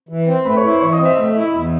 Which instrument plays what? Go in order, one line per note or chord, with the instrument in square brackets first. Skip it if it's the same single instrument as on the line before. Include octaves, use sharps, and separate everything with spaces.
[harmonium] E3
C4
[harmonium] A3 [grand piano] B4 B5
[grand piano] C#5 C#6
[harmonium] E4
[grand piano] C5 C6
[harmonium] E3 [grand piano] C#5 C#6
[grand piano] D#5 D#6
[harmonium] C4
[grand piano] E5 E6
[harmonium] A3 [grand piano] E5 E6
[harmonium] E4
E2